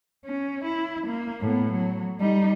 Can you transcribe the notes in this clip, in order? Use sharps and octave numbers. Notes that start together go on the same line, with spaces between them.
C#4
E4
A#3
A2 B3
F#3
G3 D#4